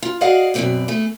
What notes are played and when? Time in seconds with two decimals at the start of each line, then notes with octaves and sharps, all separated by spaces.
0.03 F4
0.21 F#4 G#4 D5 D#5 F5 F#5
0.54 F#2 B2 D#3 F#3 C4 D5
0.88 A3 G#4